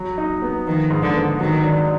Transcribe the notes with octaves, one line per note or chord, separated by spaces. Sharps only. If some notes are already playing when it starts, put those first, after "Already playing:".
Already playing: F#3
D#4
B3
D#3 F3
G#2
D3
B3
D#3 F#3
D4